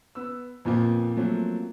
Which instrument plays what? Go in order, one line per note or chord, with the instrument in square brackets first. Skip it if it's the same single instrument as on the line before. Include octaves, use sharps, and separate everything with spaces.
[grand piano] B3 E6
F2 A#2 F3 A#3 B3
F3 F#3 A3 A#3 C4 C#4